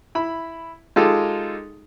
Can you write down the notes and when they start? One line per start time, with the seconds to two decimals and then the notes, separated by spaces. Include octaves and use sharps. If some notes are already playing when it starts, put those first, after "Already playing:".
0.15 E4 B5
0.96 G#3 D#4 F4 G4 A4